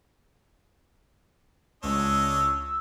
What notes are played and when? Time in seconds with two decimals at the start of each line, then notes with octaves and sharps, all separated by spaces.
1.83 C#2 D4 C#5 D#5 E6